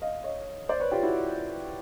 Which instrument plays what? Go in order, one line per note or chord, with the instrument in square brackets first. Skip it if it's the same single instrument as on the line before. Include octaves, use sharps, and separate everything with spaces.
[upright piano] D#5 F5
C#5 D#5
C5 D5
B4 C#5
F4 G4
E4 F#4